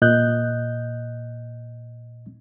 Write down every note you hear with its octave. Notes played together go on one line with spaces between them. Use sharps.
A#2 D#5 F#6 G6